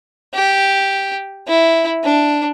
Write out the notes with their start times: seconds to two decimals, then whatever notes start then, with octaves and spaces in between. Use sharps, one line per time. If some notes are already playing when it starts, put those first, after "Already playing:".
0.34 G4
1.47 E4
2.04 D4